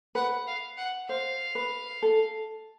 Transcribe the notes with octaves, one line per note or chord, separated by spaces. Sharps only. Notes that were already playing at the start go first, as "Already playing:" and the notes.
B4 F#5
F5
F#5
C5 F5
B4
A4